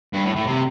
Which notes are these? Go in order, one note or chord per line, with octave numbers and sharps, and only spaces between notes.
G2
A2
A2
C3